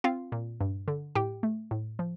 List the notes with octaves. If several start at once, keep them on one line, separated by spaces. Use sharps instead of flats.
C4 F4 F5
A#2
G2
D3
A2 G4 G5
A3
A2
F3